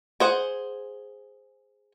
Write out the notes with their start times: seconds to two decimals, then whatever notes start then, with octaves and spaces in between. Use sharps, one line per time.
0.20 G#4 C5 F#5